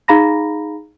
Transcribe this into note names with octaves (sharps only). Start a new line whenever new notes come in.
D#4 G#4 F5 A#5 B5 A#6